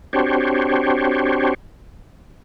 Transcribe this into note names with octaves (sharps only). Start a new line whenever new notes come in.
C4 D4 F#4 G4 C5 C#5